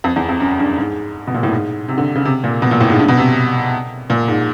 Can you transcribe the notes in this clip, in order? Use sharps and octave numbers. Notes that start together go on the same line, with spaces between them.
F2
E2
F2
F#2
G2
G#2
B2
A#2
A2
G#2
C3
D3
C#3
C3
A#2
B2
A#2
A2
G#2
G2
B2
C3
A#2
G#2